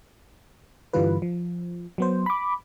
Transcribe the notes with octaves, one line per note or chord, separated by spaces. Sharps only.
G2 D3 E3 G3 F4 B4
F3
F#3 B3 C5
B5 D6